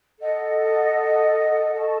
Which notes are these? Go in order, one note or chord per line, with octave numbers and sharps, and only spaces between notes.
A4 D#5 F#5
A4 D#5 A5 C#6